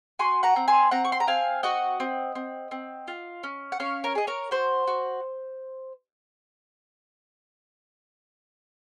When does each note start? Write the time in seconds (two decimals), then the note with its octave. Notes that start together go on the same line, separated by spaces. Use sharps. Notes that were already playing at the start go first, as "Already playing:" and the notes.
0.19 F#4 G#5 C6
0.43 F#5 A#5
0.56 C4
0.68 G#5 C6
0.91 C4 F#5 A#5
1.05 C#6
1.12 C6
1.20 A#5
1.27 C4 F5 G#5
1.63 F#4 D#5 F#5
2.00 C4
2.35 C4
2.71 C4
3.08 F4
3.43 C#4
3.72 F#5
3.80 C#4 C#5 F5
4.04 A#4 C#5
4.15 G#4 D#5
4.27 A#4 C#5
4.51 F#4 C5
4.87 F#4